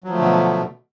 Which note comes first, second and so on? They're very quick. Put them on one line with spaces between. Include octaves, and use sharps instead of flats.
F#3 F3 A3 D3 B2